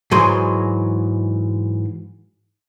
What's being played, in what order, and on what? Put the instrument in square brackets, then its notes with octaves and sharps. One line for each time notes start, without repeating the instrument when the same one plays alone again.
[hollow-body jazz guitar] G#2 E3 F#3 G#4 C6